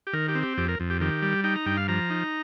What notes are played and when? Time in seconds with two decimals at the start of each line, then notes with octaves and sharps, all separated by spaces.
0.07 G4
0.13 D#3 A#4
0.28 G4
0.35 C4
0.43 G4
0.57 F2 G4
0.69 A#4
0.80 F2
0.90 G4
1.01 D#3 G4
1.22 G3
1.44 D#4 G5
1.56 A#5
1.66 G2 G5
1.77 F5
1.88 F3 A#5
2.10 D#4